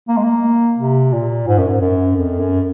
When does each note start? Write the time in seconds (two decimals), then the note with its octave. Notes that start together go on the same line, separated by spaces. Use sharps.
0.08 A#3
0.17 G#3
0.24 A#3
0.78 C3
1.13 A#2
1.47 G#2
1.58 F#2
1.69 G#2
1.81 F#2
2.16 F2
2.40 F#2